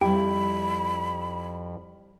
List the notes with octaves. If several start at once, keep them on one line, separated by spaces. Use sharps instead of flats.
F2 G3 E4 G4 B5